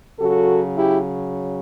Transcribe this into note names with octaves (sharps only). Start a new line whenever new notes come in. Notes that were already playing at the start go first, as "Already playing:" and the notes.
C#3 F#3 F#4 A4
E4 G4